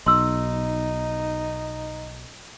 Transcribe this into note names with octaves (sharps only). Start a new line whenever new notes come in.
B1 D#4 C6 E6